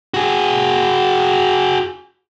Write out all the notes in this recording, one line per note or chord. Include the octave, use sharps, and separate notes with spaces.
F#4 G#4